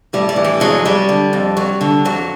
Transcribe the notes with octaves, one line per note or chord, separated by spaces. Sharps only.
A2 G3
G3
E3
G3
F2 F#3 G#3
F#3 G3
D3
F2
F#3
D3
F2 F#3